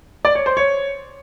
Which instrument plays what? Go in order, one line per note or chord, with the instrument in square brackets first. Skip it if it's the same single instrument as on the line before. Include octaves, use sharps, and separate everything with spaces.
[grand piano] D5
C#5
C5
C#5